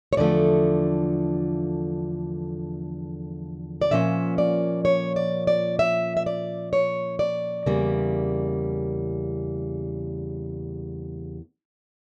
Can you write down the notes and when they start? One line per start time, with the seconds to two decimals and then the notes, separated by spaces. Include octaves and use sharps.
0.13 C#5
0.17 E2 D3 F3 A3 D5
3.82 D5
3.91 A#2 F3 A#3 C#4 E5
4.38 D5
4.85 C#5
5.16 D5
5.47 D5
5.79 E5
6.17 E5
6.26 D5
6.73 C#5
7.19 D5
7.66 E2 C#3 G3 A#3